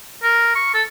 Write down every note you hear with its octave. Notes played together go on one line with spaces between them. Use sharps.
A#4
C#6
A4